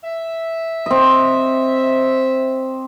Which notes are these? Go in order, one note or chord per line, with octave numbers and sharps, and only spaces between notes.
E5
C4 D#5